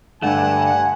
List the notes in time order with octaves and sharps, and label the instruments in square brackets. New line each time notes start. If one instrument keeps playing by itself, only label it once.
[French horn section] G2 [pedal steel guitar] D3 A3 [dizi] F#5 [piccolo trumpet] G#5